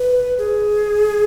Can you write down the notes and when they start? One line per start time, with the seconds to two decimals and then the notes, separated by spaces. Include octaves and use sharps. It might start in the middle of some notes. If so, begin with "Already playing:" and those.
Already playing: B4
0.38 G#4